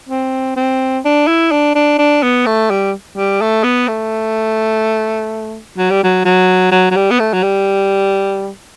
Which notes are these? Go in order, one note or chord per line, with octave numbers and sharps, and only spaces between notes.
C4
C4
D4
E4
D4
D4
D4
B3
A3
G3
G3
A3
B3
A3
F#3
G3
F#3
F#3
F#3
F#3
G3
B3
A3
F#3
G3